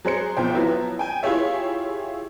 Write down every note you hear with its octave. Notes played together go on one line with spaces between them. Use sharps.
F#3 G#4 C5 C#7
B1 F3 C5 G5
F3 F#3 B3 E4
G5 G#5
E4 F4 G4 G#4 C#5 E5